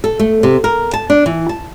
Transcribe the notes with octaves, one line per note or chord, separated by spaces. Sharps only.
A4
A3
C3
A#4
A5
D4
E3
A5